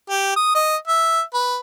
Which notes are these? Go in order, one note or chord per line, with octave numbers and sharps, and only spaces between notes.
G4
D#6
D#5
E5
B4